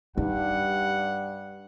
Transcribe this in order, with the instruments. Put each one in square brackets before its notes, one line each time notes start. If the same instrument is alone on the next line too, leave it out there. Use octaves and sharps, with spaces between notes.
[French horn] G2 [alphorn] G3 [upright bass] D#4 [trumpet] F#5